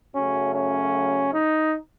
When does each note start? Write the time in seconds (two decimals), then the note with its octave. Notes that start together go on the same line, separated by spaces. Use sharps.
0.15 F#2 C#3 F#3 A3 C#4
0.55 C#4
1.33 D#4